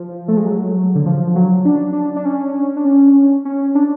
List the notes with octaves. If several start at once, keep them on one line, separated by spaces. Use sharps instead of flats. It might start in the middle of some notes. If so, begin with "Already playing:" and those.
Already playing: F3
A3
G#3
F#3
D3
F3
F#3
D4
D4
D4
C#4
D4
C#4
C#4
D4